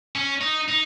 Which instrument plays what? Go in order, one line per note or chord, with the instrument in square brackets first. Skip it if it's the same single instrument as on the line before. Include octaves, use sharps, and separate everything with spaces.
[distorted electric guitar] C#4
D#4
D#4